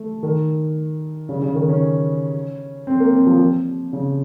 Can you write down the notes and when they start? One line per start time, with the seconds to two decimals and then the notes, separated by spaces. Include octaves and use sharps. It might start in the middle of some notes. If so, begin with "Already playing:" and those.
Already playing: A3
0.23 D#3
1.29 C#3
1.42 C#3
1.55 D#3
1.69 C#4
2.87 C4
3.00 A#3
3.13 C4
3.26 F3
3.93 C#3